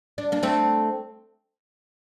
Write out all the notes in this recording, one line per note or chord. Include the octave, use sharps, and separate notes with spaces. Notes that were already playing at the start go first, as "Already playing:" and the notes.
D4
A#3 D4
A3 C4